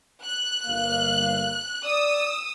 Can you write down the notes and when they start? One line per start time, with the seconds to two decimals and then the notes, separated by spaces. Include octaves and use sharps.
0.24 F#6
0.66 G1 A#3 F5
1.85 D5 D#6 E6